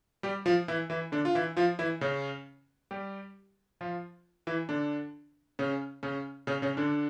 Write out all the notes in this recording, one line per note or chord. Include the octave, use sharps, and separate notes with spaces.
G3 G4
F3 F4
E3 E4
E3 E4
D3 D4
F4
E3 E4
F3 F4
E3 E4
C#3 C#4
G3 G4
F3 F4
E3 E4
D3 D4
C#3 C#4
C#3 C#4
C#3 C#4
C#3 C#4
D3 D4